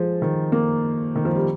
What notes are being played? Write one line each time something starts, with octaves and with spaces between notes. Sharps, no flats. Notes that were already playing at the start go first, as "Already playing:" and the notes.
Already playing: F3 G#3
D#3
A#3
D#3
F3
G3